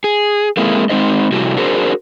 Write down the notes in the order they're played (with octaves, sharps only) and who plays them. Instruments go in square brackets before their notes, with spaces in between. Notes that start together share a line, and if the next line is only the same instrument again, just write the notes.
[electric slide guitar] G#4
G#3 A#3 C4 E4
G#3 C4 D#4 C5 D#5
C3 G3 A3 E4 F#4 G4
D4 F#4 G#4 A#4 C5